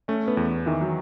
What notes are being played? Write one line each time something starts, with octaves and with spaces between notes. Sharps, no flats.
A3 C#4
B3
E2
D#3 E3
F#3